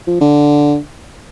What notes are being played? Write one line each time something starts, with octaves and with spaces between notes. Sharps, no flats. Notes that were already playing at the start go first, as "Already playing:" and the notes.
F3
D3